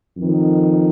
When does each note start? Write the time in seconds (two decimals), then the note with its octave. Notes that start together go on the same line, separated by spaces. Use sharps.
0.17 F2 D#3